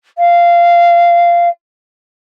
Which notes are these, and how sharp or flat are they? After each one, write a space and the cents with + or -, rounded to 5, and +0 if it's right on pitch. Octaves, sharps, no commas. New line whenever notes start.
F5 -15